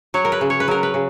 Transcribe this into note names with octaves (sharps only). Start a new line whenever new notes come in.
F#3 C#5
A#4
B4
C#3
C#5
B4
F#3 A#4
B4
C#3